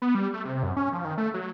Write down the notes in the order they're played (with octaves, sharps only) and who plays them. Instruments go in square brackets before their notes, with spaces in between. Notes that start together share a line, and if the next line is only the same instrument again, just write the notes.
[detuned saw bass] B3
G3
A3
C3
F#2
C#4
F3
D#3
A3
F#3